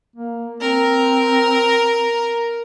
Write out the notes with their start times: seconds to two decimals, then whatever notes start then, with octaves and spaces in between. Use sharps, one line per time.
0.16 A#3
0.61 C4 A#4